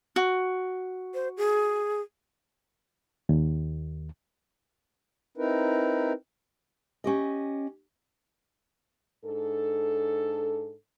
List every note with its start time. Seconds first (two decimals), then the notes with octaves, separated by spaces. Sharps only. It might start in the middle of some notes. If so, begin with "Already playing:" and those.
0.16 F#4
1.14 C5
1.37 G#4
3.29 D#2
5.38 C4 D#4 E4 A#4 B4
7.04 C#4 G4 D#5
9.25 G#2 D4 A4